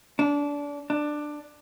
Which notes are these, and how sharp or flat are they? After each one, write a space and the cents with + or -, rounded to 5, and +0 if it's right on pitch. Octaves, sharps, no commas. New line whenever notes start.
D4 -25
D4 +15